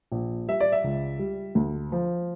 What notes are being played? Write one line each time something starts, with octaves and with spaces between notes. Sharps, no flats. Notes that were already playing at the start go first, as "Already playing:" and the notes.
A#1
G3 E5
D5
E5
C#2
G3
D2
F3